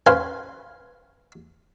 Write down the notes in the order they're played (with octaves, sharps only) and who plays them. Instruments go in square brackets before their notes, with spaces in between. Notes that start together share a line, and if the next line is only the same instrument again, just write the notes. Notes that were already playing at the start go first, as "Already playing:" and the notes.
[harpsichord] C#4 B4 C5 F5 G#5